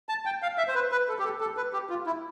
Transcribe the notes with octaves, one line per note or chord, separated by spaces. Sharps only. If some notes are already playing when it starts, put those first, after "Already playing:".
A5
G5
F5
E5
C5
B4
B4
A4
G4
A4
A4
B4
G4
F4
E4